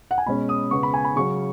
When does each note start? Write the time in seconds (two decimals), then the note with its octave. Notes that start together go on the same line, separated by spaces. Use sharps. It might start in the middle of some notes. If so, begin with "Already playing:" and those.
0.11 F#5
0.18 G#5
0.26 B2 G#3 C#4 B5
0.49 D#6
0.71 C#3 B3 C#6
0.83 B5
0.94 G#5
1.05 B5
1.16 C#3 F#3 C#4 C#6